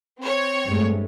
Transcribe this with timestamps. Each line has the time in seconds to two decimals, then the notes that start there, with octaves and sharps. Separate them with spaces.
0.20 C4 C#5
0.68 G2 G#3 A3